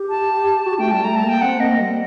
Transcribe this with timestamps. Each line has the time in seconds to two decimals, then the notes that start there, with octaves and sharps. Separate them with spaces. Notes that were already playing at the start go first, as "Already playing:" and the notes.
Already playing: G4
0.09 A5
0.66 F#4 A5
0.79 A3 G5
0.91 G3 A5
1.04 A3 A#5
1.16 A5
1.23 A#3
1.29 G5
1.41 C4 F#5
1.60 A#3 D#5
1.79 G3